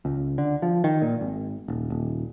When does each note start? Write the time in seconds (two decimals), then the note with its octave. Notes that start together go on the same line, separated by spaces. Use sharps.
0.05 C#2
0.38 D3
0.62 F3
0.84 D#3
1.02 A#2
1.21 G#1
1.68 D#1
1.90 D#1